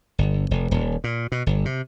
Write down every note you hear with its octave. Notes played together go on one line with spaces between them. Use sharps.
G1
F1
D#1
A#2
B2
G1
C3